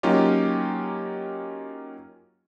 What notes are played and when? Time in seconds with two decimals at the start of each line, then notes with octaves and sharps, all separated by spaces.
0.03 F#3 A#3 C#4 D#4 F4 G4